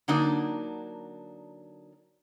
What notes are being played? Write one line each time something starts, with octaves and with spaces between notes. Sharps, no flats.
D3 F#3 A#3 D4 D#4